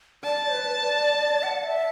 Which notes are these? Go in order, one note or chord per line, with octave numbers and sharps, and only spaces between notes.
D5 A5
B4
D5
F#5
E5